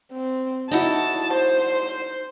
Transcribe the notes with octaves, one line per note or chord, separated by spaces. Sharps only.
C4
D#4 E4 F#4 A5
C5